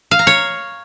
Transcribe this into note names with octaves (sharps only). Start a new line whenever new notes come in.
F5
A#5
C#5